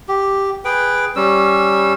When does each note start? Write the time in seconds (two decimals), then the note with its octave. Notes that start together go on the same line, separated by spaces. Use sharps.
0.08 G4
0.65 G#4 B4 G5
1.16 G3 C#4 E6